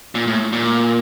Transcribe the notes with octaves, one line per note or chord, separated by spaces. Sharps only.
A#2
A2
A#2